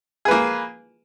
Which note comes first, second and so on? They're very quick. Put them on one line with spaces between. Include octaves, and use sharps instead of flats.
G#4 B4 A#3